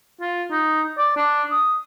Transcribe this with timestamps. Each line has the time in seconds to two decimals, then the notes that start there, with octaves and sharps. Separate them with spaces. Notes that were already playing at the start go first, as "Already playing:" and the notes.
0.21 F4
0.51 D#4
0.98 D5
1.16 D4
1.51 D#6